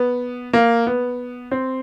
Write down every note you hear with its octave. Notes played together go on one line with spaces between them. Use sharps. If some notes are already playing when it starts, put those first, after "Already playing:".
Already playing: B3
A#3
B3
C4